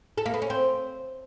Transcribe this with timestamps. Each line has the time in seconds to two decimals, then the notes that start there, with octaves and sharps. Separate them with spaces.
0.18 A4
0.26 A#3
0.34 B3
0.42 C#4
0.50 C4